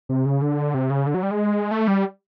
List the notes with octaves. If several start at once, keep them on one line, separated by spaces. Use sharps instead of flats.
C3
C#3
D3
C3
C#3
D3
F#3
G3
G#3
A3
G3